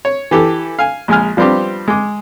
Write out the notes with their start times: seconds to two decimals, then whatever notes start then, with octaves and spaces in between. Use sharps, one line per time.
0.05 C#5
0.31 E3 G4 A4
0.79 F5 G#5
1.08 A#1 G#3 G#5 F6
1.37 F3 G3 B3 C4 D4 G4
1.88 G#3 D6